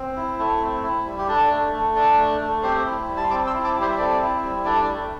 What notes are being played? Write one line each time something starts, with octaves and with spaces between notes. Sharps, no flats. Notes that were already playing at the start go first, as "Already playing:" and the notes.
Already playing: C4
E4
A3
C4
E4
G3
G4
D4 A4
A3
A3
D4 A4
A3
A3
C4 G4 C5
E4
G3
A5
C6
C4 A5 D6
C6 E6
E4
A5 D6
G3
G4 C5
E5
C4 A4 D5
E4
G3
D4 A4 D5
A3